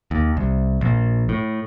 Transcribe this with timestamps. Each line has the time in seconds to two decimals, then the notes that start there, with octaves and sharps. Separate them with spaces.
0.11 D#2
0.37 C2
0.81 A#1
1.29 A2